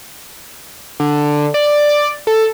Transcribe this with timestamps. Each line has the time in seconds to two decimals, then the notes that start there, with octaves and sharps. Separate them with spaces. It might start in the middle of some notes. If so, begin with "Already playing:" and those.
1.00 D3
1.54 D5
2.27 A4